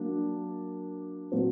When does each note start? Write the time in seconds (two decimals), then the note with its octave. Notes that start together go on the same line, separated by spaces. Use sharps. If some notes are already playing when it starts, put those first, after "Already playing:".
Already playing: F#3 A#3 D4
1.32 A#2 F#3 C4